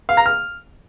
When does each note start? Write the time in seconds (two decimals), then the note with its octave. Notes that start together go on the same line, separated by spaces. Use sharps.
0.09 F5
0.17 A#5
0.26 F6